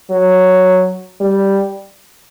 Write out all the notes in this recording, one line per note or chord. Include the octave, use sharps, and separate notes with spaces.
F#3
G3